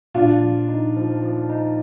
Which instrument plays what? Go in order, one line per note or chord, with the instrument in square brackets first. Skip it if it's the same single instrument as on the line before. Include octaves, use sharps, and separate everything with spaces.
[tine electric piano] A#2 [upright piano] D4 F4
[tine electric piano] F3
D#4
F3
F3
D#4